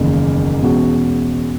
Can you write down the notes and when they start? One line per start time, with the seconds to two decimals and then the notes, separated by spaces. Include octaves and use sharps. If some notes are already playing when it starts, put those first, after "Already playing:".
Already playing: F#1 E2 D#3 A#3
0.61 E2 B2 G#3 C#4 F#4